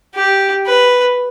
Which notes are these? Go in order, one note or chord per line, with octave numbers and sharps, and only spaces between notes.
G4
B4